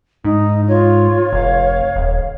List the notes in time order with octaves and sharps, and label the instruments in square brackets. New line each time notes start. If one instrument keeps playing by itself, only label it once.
[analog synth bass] G#2 [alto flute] D#4
[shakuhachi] F4 [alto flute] C#5
[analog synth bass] F1 [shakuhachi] F5
[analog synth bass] D#1